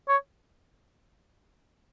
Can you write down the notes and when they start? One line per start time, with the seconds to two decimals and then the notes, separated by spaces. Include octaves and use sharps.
0.08 C#5